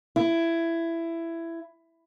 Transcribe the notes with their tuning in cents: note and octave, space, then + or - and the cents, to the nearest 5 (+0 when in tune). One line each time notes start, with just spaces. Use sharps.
E4 +15